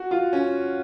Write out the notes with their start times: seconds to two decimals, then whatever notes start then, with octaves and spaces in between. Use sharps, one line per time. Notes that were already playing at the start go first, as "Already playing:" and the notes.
Already playing: F#4
0.11 F4
0.33 C#4